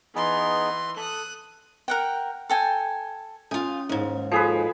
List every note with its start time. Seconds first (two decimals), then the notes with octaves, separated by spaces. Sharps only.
0.15 E3 B3 D#4 G#4 C6
0.97 A4 D#6 F#6
1.88 A#4 F#5 G5
2.50 A4 G5 G#5
3.51 C#4 F4 G#5 D#6 G6
3.89 D#2 G#2 C#4
4.32 F3 F#4 G#4 A4 B4